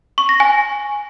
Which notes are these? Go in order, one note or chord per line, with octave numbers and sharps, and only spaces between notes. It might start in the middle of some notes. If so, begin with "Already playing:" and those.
C#6
A#6
G#5